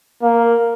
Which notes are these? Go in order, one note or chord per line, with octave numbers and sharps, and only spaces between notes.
A#3